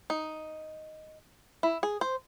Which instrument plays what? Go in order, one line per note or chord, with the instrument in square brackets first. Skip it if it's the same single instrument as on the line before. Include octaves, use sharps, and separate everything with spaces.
[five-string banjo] D#4
E4
G#4
C5